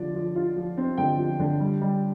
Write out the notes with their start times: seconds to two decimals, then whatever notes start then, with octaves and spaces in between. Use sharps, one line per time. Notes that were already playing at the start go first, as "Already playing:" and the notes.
Already playing: D3 F3 F4 D5
0.15 F3
0.36 F4
0.56 F3
0.77 C4
0.97 D3 G5
1.19 F3
1.40 D3
1.60 G3
1.81 G3